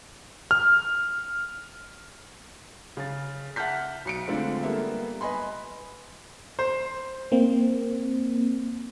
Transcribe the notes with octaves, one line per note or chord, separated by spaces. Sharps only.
F6
C#3 A6
E5 F#5 A5 F6 G6 B6
B1 C#7 D7
D3 G#3 A3 C4 D4 F4
G3 A#3 B3 A4 E5
B4 D#5 G#5 B5 C6
C5
A#3 C4